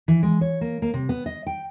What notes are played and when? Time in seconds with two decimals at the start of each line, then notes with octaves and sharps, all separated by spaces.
0.08 E3
0.23 G#3
0.41 C#5
0.61 A#3
0.82 A#3
0.94 C3
1.09 B3
1.26 D#5
1.46 G5